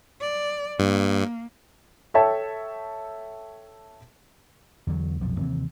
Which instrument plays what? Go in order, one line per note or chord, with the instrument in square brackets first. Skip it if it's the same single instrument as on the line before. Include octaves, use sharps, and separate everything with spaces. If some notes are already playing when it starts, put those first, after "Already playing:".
[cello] D5
[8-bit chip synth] G2 [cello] A#3
[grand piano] A4 C#5 E5 G5 A5
[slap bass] E2 D3 F#3
B1 F2 A#2 F3
D#2 C3 E3 C4